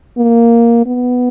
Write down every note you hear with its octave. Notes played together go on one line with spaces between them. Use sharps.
A#3
B3